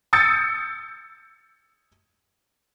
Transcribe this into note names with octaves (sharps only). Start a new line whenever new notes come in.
D#6 E6 G6 A6 C#7